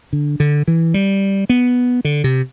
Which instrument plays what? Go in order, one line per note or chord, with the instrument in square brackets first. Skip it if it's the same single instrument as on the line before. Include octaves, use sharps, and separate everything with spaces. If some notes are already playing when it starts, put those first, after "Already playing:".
[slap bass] D3
D3
E3
G3
B3
D3
C3